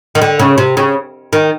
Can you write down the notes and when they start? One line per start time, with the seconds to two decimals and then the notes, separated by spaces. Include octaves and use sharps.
0.15 D#3
0.22 D3
0.39 C#3
0.58 C3
0.77 C#3
1.33 D#3